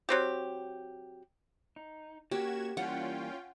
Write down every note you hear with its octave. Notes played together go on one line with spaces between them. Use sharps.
F#3 C4 G4
D#4
A#3 C#4 F#4 G4 G#6 E7
E3 G3 A#3 C#4 F4 F#5 G5